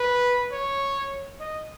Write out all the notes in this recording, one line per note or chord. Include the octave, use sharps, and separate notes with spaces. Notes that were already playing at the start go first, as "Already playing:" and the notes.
Already playing: B4
C#5
D#5